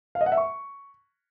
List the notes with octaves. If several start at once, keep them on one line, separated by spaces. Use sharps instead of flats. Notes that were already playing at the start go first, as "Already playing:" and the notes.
F5
D#5
F#5
E5
C#6